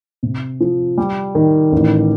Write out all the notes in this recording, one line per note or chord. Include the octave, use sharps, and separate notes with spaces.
C3
F3
G3
D#3
A1